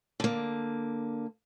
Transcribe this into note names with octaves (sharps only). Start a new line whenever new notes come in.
D3 A#3